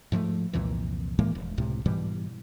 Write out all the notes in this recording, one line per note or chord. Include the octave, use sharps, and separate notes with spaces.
G#2 F3 F#3 A3
C2 F2 A#2 E3
A2 E3 G#3 A#3
E1
C#2 A2 C3
G#2 B2 E3 G3